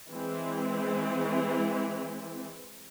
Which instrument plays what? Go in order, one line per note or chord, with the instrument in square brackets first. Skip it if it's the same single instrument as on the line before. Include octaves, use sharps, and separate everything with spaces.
[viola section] E3 G#3 C4